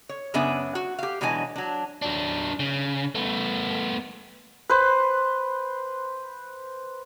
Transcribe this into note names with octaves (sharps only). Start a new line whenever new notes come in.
C#5
F#2 C#3 B3 D4 E5 G#5
F#4
G4 F5
B2 E3 F#3 G#3 D4 G#5
F#3 D4
F#3 D4
C#3
A3 B3
B4 C5